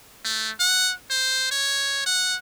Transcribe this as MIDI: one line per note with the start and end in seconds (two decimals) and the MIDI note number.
0.25 0.50 57
0.60 0.92 78
1.10 1.48 72
1.51 2.04 73
2.06 2.36 78